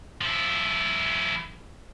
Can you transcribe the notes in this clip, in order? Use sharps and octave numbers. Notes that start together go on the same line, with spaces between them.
F3 E4